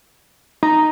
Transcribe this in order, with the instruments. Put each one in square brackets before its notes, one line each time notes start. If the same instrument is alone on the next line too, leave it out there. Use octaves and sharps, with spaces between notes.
[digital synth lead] D#4 [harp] A#5